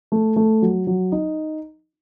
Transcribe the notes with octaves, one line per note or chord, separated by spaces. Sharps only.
A3
A3
F#3
F#3
D#4